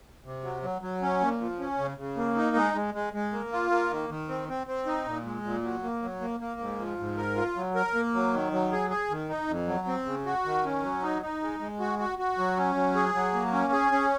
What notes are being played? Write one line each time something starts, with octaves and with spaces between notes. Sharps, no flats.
C3
F#3
F#3
F#3
C#4
A#2
F3
C#4
C#3
C#3
A#3
D#4
G#3
G#3
G#3
G#3
A#3
F4
A#3
D#3
D#3
C4
C4
C4
D#4
A#2
G#3
A#2
F#3
A#3
F#3
A#3
A#3
G#2
F3
G#2
A#4
F4
F#3
A#4
A#3
F#3
D#3
F#3
G#4
G#4
D#3
D#4
F2
F#3
C4
C#3
F#4
D#3
C#4
F#3
D#4
D#4
G#3
G#3
F#4
F#4
F#4
F#3
C#4
F#3
G#4
F#3
A#3
C#4
G#4
C#4